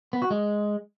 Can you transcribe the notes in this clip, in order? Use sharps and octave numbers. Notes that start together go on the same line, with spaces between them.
B3
F#4
G#3